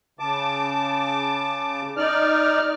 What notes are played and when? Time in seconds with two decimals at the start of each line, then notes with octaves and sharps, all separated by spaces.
0.19 C#3 A5 D6
1.97 D#4 D5 F6